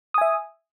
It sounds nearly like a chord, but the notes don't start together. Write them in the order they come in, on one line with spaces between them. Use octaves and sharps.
D#6 G#5 E5